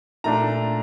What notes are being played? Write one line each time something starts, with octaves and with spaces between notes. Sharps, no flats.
A#2 A3 D4 A#5